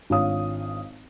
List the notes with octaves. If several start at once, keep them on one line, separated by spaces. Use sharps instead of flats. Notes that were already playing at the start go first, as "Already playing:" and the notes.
G#1 D4 F4 C#5 F5 D#6